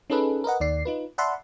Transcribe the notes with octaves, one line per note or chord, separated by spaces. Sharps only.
C#4 D#4 G#4 A4 B4
A#4 B4 D#5 F#5
D#2 D#3 D5 C7
D#4 F4 B4
D5 E5 F#5 A5 B5 C6